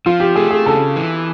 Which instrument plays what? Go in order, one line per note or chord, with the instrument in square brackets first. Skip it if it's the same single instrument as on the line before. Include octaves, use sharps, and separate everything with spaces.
[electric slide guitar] F3 [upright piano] F4
[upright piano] G4
[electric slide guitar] A3 [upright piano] G#4
[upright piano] G#4
[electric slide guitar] C#3 [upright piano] A4
[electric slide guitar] E3